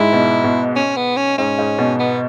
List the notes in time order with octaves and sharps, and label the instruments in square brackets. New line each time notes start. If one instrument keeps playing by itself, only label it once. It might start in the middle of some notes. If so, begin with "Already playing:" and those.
Already playing: [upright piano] G#2 G#3 [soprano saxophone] E4
[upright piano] B2
B2
[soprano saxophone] C#4
B3
C#4
[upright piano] G#2 [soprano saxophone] C#4
[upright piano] G#2
B2
[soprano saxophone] B3